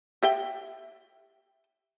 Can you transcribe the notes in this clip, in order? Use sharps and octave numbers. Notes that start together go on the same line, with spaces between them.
G4 E5 G5